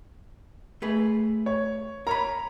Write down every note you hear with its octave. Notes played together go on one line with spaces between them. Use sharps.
A3 G#4 B4
C#5
A#4 C#5 A#5 B5